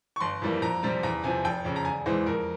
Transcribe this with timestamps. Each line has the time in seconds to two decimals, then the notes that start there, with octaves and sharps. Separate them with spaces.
0.16 C#6
0.20 G1 C6
0.42 F2 E3 G3 A#3
0.62 F2 A#5
0.83 C3 G3 C4
1.03 E2 A#5
1.23 C3 F3 C4 G#5
1.44 F1 G5
1.64 F2 C#3
1.76 A#5
1.85 E1 G#5
2.06 E2 E3 G#3 C5
2.26 F2 A#4